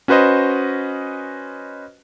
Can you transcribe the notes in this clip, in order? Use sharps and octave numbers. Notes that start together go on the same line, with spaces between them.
C#4 F#4 B4 C5 D#5